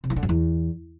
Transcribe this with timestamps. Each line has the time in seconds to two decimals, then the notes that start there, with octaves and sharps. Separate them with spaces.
0.04 C3
0.10 E3
0.16 D3
0.23 F#2
0.29 E2